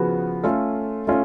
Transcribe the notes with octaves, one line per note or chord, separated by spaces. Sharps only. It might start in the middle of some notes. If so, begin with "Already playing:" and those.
Already playing: C#3 F3 B3 F#4
A3 C#4 F4 A4
A3 C#4 F4